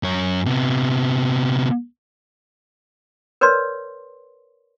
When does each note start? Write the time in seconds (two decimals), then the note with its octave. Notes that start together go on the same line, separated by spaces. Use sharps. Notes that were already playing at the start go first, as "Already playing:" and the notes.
0.03 F#2 C#5
0.45 C3 B3
3.41 A#4 B4 C#5 D5 C6